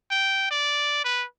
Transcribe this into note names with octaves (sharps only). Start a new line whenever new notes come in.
G5
D5
B4